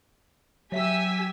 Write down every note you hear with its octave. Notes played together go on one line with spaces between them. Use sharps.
F#3 G4 E5 G#5 E6 B6